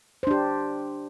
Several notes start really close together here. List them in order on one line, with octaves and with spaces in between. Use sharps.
C5 D4 G4